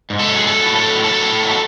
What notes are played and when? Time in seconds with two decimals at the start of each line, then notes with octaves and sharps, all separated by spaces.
0.10 G#2
0.19 A4
0.29 F#3
0.36 G#4
0.47 F#3 A4
0.66 A2
0.76 A4
0.85 F#3
1.03 F#3 A4
1.22 A2
1.42 F#3